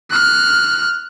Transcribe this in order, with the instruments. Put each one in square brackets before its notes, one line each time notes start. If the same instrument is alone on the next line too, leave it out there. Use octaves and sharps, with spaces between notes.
[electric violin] F6 F#6